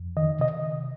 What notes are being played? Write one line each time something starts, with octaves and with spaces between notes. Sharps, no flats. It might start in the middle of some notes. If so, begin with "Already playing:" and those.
Already playing: F2
D#3 D#5
C3 D#5